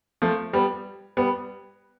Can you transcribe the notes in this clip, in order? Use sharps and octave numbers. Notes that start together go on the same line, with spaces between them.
F3 A3
G3 B3
G3 B3